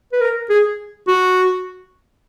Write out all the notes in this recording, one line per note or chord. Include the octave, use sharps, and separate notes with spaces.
B4
A#4
G#4
F#4